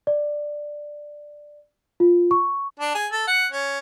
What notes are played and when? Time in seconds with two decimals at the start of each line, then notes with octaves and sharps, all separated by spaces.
0.07 D5
2.00 F4
2.31 C#6
2.80 D4
2.95 G#4
3.12 A4
3.27 F#5
3.52 C#4